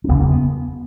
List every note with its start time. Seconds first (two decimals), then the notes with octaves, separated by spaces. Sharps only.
0.04 C#4
0.08 F#1 E2 C#3 B3
0.19 A#3
0.31 B3